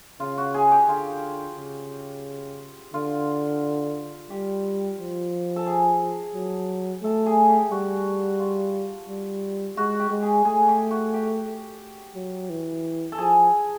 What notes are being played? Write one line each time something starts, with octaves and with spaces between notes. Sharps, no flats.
C#3 F4
F#4
G#4
G4
D3 F4
C#3
D3 F4
G3 G4
F3
A4
G#4
F#3
A3 A4
G#4
G4
G3 F#4
F4
G3
G#3 F#4
G4
G#3
G#4
A3 G#4
G4
F#4
G4
F#3
E3
A4
F3 G#4